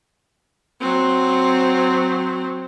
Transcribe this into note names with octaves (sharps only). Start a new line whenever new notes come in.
F#3 C4